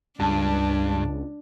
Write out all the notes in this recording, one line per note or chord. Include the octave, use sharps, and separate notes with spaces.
C#2 G2 D4 A5